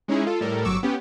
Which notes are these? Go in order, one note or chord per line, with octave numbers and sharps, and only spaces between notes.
G#3 C#4 D#4 E4 G#4
F4 A4
A2 G3 A4 A#4
G1 F#3 C#6 D6 E6
B3 C#4 G4